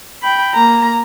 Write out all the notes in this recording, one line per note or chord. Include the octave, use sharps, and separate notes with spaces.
G5 B5
A#3 A#5